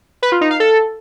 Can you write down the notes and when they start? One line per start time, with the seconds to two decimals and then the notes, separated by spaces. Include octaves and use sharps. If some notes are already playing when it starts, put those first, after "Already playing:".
0.22 B4
0.32 F4
0.41 D#4
0.51 F5
0.60 A4